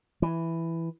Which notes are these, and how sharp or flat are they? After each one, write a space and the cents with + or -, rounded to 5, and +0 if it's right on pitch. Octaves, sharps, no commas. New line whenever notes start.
E3 +5